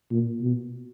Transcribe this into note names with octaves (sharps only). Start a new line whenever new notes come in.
A#2
B2